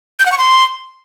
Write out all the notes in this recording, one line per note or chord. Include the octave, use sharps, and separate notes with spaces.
G6
F#5
C#6
C6